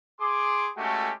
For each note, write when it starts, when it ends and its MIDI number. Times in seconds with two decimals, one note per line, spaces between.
0.20 0.71 68
0.20 0.71 84
0.20 0.71 86
0.77 1.12 56
0.77 1.12 57
0.77 1.12 61
0.77 1.12 66
0.77 1.12 67
0.77 1.12 69